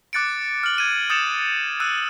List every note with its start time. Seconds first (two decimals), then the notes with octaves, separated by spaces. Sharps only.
0.13 D6 F#6 A6 C#7 D7
0.63 F6 F#7
0.78 G#6 D#7
1.10 D#6 G6 A6 C#7 E7 F7
1.80 E6 F#6 D#7